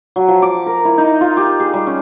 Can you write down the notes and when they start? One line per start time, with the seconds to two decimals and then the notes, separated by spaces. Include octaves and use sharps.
0.16 F#3
0.28 F3
0.42 D6
0.66 A#4
0.85 E4
0.98 D#4
1.21 F4
1.37 G4
1.60 G#4
1.74 G3
1.87 C#4